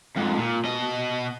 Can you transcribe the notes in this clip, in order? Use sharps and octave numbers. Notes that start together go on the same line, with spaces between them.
F2 G#2
A#2
B2 D#5